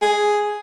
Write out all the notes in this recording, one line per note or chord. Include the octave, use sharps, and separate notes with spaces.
G#4